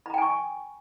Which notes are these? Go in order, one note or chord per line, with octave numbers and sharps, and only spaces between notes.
G5 G#5 A#5 B5 C#6